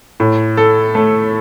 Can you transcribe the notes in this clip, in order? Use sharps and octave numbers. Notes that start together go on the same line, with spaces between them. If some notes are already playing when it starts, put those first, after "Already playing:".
A2
A4
A3